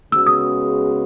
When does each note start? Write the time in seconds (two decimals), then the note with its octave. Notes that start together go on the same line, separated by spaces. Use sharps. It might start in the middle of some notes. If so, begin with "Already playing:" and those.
0.12 C#3 G#3 B3 F#4 E6
0.26 D#6